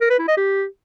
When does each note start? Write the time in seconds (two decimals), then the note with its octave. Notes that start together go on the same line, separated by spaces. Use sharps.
0.01 A#4
0.10 B4
0.19 E4
0.28 D#5
0.37 G4